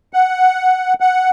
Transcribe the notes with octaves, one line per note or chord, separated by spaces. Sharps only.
F#5
F#5